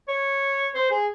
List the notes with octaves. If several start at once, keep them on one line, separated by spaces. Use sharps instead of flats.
C#5
C5
G#4